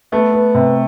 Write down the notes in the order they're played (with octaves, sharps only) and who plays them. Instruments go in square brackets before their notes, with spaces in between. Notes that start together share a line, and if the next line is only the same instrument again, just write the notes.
[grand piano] A3 [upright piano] B3
[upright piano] B3
C3